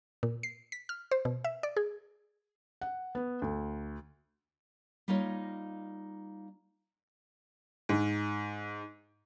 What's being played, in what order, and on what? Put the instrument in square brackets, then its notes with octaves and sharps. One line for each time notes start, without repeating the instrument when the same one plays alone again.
[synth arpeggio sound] A#2
C7
B6
F6
C5
B2
E5
D5
G#4
[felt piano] F#5
B3
D2
[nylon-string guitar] G3 A#3 D#4 F4 C#5 D#5
[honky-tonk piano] G#2